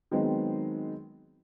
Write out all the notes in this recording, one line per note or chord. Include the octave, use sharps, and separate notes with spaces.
D#3 F#3 G#3 B3 C4